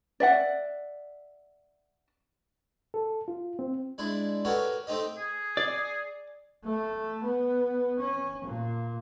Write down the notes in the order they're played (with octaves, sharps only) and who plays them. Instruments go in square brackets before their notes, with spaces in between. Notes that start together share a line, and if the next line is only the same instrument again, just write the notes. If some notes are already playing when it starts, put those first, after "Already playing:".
[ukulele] D5 E5 F#5
[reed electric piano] A4
F4
C4
[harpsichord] G#3 D4 E4
B3 F#4 G4 A4 A#4 C#5
A3 C4 D#4 G4 D#5
[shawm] G#4
[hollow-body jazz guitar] D5
[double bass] A3
B3
C#4
A#2